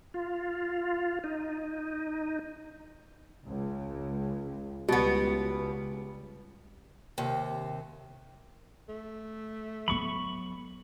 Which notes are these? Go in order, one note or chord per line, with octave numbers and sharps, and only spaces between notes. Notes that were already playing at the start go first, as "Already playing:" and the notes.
F4
D#4
C#2
C#2 B2 G3 B3
D#2 C3
A3
F#3 B3 B5 C#6